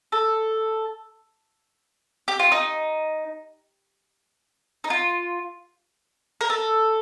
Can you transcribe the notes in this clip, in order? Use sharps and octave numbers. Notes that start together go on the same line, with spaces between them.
A4
G4
F4
D#4
D#4
F4
A#4
A4